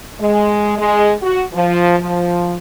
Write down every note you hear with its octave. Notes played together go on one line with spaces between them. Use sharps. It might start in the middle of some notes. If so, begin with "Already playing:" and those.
G#3
G#3
F#4
F3
F3